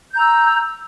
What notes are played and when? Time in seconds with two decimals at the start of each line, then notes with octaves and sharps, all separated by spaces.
0.11 G6
0.15 A#5
0.19 E6